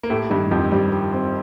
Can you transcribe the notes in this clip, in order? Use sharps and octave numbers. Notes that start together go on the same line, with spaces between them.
A#3
A2 A3 G4
G2 D#3 G3
F2 F3 G4
G2 G3 C4
G4
C4